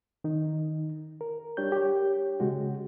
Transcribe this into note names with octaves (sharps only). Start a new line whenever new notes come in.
D#3 D#4
A#4
G3 D4 G4 C#5 G6
G4 C#5
C#3 G#3 F#4